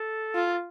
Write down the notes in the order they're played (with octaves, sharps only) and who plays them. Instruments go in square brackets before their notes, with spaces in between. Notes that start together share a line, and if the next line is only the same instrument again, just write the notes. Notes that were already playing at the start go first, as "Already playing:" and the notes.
Already playing: [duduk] A4
[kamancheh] F4